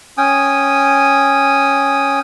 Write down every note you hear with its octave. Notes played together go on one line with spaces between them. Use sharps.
C#4 G5 G#5 D#6